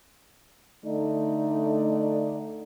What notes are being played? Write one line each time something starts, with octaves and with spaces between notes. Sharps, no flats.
D3 A3 D4 D#4 D5